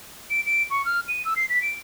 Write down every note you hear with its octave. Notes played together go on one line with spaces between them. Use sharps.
D7
D7
C#6
F6
D#7
E6
C7
B6
D7